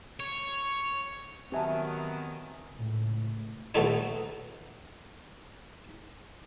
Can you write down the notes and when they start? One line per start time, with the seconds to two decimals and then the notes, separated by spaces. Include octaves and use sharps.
0.20 C#5
1.52 D#3 F#3 B3 C4 G4 E5 G#5 A5
2.73 C#2 A2
3.75 A#1 B2 F#3 A3 D#4 E4